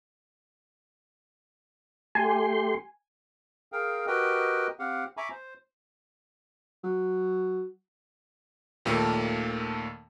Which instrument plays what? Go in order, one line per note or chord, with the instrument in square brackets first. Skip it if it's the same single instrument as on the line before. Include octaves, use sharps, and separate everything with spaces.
[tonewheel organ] A3 G4 C6 [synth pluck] G#5
[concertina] G#4 A#4 F5 G5
F#4 G4 A#4 B4 D#5 G5
C4 G4 F5 F#5
E5 G#5 A#5 B5 C#6 D6
C5
[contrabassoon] F#3
[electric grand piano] D#2 A#2 D#3 A3 A#3